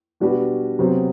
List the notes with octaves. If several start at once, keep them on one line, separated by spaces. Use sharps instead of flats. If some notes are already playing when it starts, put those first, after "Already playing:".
B2 G3 D4 F#4 B4
C3 F#3 B3 F#4 C5